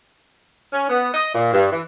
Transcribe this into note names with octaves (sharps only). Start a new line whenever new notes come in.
C#4
B3
D#5
A#2
G2
E3